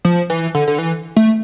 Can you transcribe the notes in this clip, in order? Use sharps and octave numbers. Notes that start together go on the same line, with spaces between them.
F3
E3
D3
D3
E3
A3